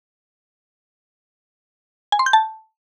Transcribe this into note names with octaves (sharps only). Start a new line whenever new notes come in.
G#5
C6
G6
A5